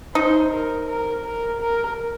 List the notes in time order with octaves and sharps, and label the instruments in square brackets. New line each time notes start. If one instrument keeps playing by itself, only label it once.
[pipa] D#4 [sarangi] C5
[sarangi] A#4
A#4
A#4
A#4